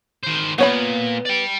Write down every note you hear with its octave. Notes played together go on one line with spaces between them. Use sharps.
D#3 C5
A#2 B3 C#5 B5
D5 G5